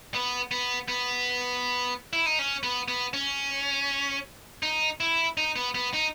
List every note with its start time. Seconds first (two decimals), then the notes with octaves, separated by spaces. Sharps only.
0.14 B3
0.51 B3
0.88 B3
2.13 E4
2.26 D#4
2.39 C#4
2.63 B3
2.88 B3
3.14 C#4
4.63 D#4
5.00 E4
5.37 D#4
5.56 B3
5.75 B3
5.93 D#4